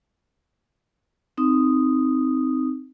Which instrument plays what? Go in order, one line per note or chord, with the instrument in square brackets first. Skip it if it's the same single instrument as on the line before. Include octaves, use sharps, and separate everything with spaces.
[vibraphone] C4 D#4 D#6